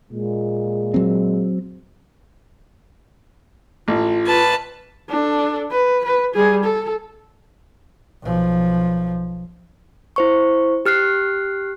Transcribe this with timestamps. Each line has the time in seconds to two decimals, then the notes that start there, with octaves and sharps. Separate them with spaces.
0.11 A#2 G#3
0.94 F#3 C4
3.88 A1 F4
4.26 B4 A5
5.09 D4 A4
5.71 B4
6.05 B4
6.34 G3 G#4
6.64 A4
8.22 B1 F3
10.16 E4 C5 C#6
10.86 G4 F6 F#6 C7